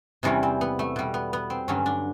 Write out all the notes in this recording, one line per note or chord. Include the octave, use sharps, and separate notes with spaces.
E2 C3 E3 G3 C#4
C4
B3
A3
B2 G3
B3
B3
C4
G2 D3 F#3 C#4
D4